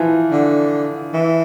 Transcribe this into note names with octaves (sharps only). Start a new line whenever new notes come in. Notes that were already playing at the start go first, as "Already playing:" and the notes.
Already playing: E3 F3
D3
E3